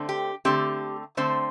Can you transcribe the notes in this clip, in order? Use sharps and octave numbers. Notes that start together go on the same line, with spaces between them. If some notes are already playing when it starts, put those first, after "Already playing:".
Already playing: D3 A3 C4
G4
D3 A3 C4 G4
D3 A3 C4 C5